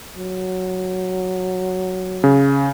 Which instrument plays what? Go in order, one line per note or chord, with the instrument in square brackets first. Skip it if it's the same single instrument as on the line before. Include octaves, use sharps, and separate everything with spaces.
[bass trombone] F#3
[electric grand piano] C#3